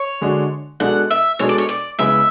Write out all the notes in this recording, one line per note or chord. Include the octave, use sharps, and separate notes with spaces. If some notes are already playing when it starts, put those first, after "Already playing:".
Already playing: C#5
D3 G#3 D4 F#4
B2 G#3 D4 A4 F#5
E5
B2 G#3 D4 A4 C#5
D5
C#5
D5
C#3 G#3 B3 E4 E5